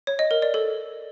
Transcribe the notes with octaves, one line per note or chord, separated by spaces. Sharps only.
C#5
D#5
A#4
D5
A4